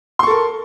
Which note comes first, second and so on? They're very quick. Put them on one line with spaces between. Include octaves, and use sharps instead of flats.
C6 C#6 A4 A#4